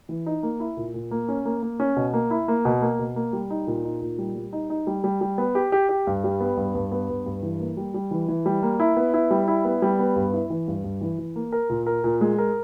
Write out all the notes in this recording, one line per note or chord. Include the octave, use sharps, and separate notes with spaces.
E3
D#4
A#3
E4
A#2
A#2
A#3
C#4
A#3
A#3
C#4
B2
A#3
E4
A#3
B2
A#3
B2
A#3
G3
D#4
A#2
D#4
A#2
G3
G3
D#4
D#4
G3
G3
G3
B3
G4
G4
G4
G2
G3
B3
G2
G2
B3
G2
G2
E3
A#3
G3
G3
E3
E3
G3
A#3
E4
B3
E4
G3
E4
B3
G3
B3
G2
E4
E3
G2
G2
E3
E3
A#3
A#4
A#2
A#4
A#2
G#3
A#4